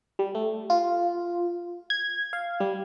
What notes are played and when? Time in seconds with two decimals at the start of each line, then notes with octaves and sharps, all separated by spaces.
0.19 G3
0.35 A3
0.70 F4
1.90 G#6
2.33 F5
2.60 G3